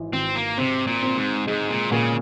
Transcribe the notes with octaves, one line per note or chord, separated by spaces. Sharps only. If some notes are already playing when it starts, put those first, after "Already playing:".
Already playing: G#1 E3
G#1 C4
A#3
C3 C4
A#2
C4
G#2
G#2 G#3
A#2
A#2 C#3